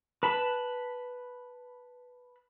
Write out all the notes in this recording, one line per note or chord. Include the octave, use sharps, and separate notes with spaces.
B4 A5 B5